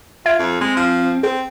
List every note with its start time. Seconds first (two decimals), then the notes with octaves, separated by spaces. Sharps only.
0.26 F4 E5 G#6 D7
0.39 F2
0.61 G#3 C4
0.77 F3
1.23 C4 G#4